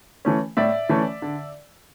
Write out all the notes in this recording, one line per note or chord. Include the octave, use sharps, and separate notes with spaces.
E3 A3 C#4
A2 D5 E5
E3 A3 C#4
D3